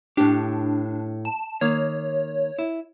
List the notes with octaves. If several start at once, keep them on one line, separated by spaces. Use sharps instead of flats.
A2 D4 G4
A5
D#3 A#3 C#5
E4